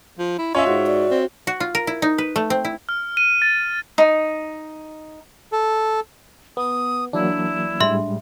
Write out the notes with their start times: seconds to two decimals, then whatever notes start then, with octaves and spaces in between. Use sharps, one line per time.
0.19 F3
0.38 E4
0.55 C#4 F4 C#5 D#5 E5
0.66 G#2 F#4
0.87 D5
1.11 C4
1.47 F#4
1.60 F4
1.75 A#4
1.87 E4
2.02 D#4
2.18 B4
2.36 A3
2.50 C4
2.65 E4
2.89 F6
3.17 D#7
3.42 A6
3.98 D#4
5.52 A4
6.57 B3 D#6
7.13 E3 F#3 A#3 D4 E4
7.80 A2 G3 G#3 E5 C6